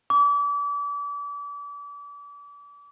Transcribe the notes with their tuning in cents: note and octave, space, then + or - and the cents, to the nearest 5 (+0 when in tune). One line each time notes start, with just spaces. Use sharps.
D6 -35